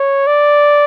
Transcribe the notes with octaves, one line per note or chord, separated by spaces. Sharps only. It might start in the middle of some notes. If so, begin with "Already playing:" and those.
Already playing: C#5
D5